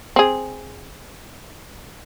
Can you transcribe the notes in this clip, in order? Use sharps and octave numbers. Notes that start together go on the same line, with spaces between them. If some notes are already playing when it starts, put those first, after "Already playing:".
C4 G#4